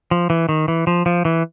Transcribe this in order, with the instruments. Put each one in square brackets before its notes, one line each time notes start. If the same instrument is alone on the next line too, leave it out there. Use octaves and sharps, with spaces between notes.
[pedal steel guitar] F3
E3
D#3
E3
F3
F3
E3